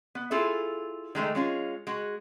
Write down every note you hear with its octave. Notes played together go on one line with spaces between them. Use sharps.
B3
E4 F4 G#4 A4
D#3 G#3 A3 D#4
G#3 C#4 F4
G#3 F#4